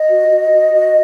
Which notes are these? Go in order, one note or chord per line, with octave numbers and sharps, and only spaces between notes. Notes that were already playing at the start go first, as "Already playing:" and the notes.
Already playing: D#5
F#4
F#4
F#4
F#4